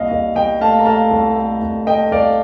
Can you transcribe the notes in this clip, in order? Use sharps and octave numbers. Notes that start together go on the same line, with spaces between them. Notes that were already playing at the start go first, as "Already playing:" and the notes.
Already playing: C2 A#2 D#5 F5
C2 D#5
C2 D#5 G5
A3 F5 A5
A#5
A3 F5 A5
C2
A3
C2
A3 D#5 G5
C2 D5 F5